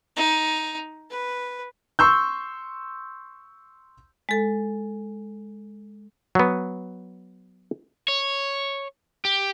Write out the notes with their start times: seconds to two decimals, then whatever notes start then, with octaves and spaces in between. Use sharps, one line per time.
0.17 D#4
1.10 B4
1.99 C6 C#6 E6 G6
4.29 G#3 A4
6.35 F#3 B3
8.08 C#5
9.25 G4